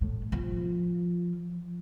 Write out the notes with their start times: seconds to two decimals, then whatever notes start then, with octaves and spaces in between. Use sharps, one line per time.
0.01 A2
0.32 F3